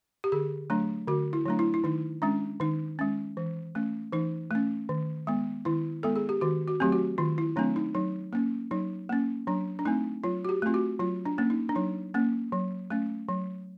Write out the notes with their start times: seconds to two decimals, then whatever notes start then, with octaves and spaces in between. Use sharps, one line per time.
0.24 G4
0.32 D3 G#4
0.70 F#3 A3 D4
1.07 D3 F#4
1.33 E4
1.46 F#3 A3 D4
1.59 E4
1.74 E4
1.84 D#3 D#4
2.22 G#3 C#4 D4
2.60 D#3 D#4
2.99 G#3 C#4
3.37 E3
3.75 A3 C#4
4.13 E3 D#4
4.51 A3 C#4
4.89 D#3
5.27 G#3 B3
5.65 D#3 E4
6.03 G#3 B3 A4
6.16 G#4
6.29 G4
6.41 D#3 F#4
6.68 F#4
6.80 F#3 A3 C4 G4
6.92 F#4
7.18 D#3 F4
7.38 E4
7.56 F#3 A3 C4 D4
7.76 D#4
7.95 F#3 D#4
8.33 A#3 C#4
8.71 F#3 D#4
9.09 A#3 C#4
9.47 F#3 D4
9.79 D4
9.85 A3 C4 D#4
10.24 F#3 F4
10.45 F#4
10.49 G4
10.62 A3 C4 F4
10.74 F#4
10.99 F#3 F4
11.26 D4
11.38 A#3 C#4
11.50 D#4
11.69 D4
11.75 F#3 D#4
12.14 A#3 C#4
12.52 F#3
12.90 A3 C#4
13.29 F#3